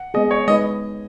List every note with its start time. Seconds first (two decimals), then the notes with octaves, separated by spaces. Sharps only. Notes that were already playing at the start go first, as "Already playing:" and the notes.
Already playing: F#5
0.14 G#3 B3 G#4 D#5
0.31 C#5
0.48 G#3 D#4 B4 D#5